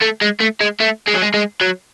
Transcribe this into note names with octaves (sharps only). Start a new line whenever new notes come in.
A3
G#3
A3
G#3
A3
G#3
F#3
G#3
G#3
F#3